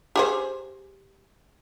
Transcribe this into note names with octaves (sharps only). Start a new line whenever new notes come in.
G4 G#4 C5